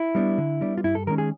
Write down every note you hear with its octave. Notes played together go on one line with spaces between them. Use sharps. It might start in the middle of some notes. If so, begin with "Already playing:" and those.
Already playing: E4
G3 B3 D4
D3
G3 B3 D4
F4
G2 E4
A4
D#3 G#3 C#4 A#4
G#4